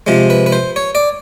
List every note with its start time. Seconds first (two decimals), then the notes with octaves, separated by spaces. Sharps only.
0.07 C3 F3 G#3
0.30 B4
0.46 B4
0.52 C5
0.76 C#5
0.95 D5